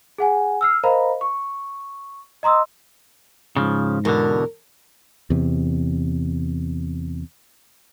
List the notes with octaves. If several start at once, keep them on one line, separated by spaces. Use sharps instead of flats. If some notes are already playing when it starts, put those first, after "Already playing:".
G#4 F#5 G#5
E6 F6 C7
A#4 C5 D#5 F5 A#5 B5
C#6
D#5 A#5 C6 D#6 E6
G#2 C#3 F3
E2 B2 D3 A#4
E2 C3